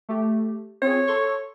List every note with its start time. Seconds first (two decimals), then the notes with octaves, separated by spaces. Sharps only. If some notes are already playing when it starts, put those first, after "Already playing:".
0.09 A3 G4
0.82 C4 F4 G#4 C#5
1.07 A4 C6 C#6